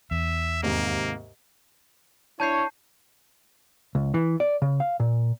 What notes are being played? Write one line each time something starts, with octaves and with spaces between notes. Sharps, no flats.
E2 E5
D#2 G#2 C3 A#3
D4 E4 C#5 A5 G6 C7
C#2
E3
D5
C#3
F5
A#2